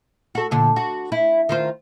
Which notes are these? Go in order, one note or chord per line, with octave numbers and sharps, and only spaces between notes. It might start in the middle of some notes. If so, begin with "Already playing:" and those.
F#4 A4
A#2 D3
F#4
E4
D#3 F4 C5